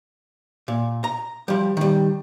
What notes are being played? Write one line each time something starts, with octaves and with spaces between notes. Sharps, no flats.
A#2
A#5
F3 G3
D#3 G3